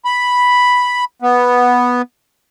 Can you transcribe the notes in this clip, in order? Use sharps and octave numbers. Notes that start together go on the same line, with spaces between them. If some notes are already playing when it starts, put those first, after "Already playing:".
B5
B3